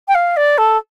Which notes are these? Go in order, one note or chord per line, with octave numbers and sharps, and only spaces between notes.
G5
F5
D5
A4